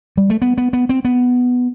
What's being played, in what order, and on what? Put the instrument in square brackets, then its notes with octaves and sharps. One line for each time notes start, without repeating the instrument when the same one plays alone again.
[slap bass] G3
A3
B3
B3
B3
C4
B3